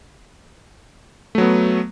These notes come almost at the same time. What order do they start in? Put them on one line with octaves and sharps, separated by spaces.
A3 F#3 B3